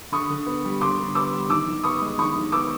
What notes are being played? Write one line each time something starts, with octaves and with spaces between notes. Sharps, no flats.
D3 C#6 D#6
D3
B3
G3
D3 C6 D6
D3
B3 D6 E6
G3
D#3 D6 E6
D#3
B3 C#6 D#6
G#3
D#3 C#6 D#6
D#3
B3 D6 E6